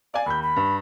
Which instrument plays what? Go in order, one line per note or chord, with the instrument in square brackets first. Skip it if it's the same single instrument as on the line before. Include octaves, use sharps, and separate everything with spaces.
[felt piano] D5 G#5 [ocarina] F5
[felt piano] D#2 G6 [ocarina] B5
[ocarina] B5
[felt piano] G2